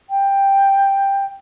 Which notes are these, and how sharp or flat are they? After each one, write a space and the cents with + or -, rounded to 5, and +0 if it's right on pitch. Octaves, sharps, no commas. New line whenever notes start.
G5 +10